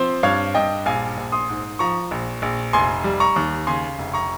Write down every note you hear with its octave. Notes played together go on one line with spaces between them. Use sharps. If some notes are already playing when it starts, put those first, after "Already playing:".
Already playing: F3 C4 C5
G2 C#5 F5
G2 D#5 G5
A#1 F5 G#5
A#1
C6 D#6
G#2
F3 A#5 C#6
A#1
A#1
F1 G#5 C6
G3
A#5 C#6
D#2
C#3 G#5 C6
F1
A#5 C#6